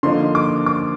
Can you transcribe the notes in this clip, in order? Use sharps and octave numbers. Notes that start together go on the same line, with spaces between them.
D3 F3 A#3 D#4 C6
D6
D6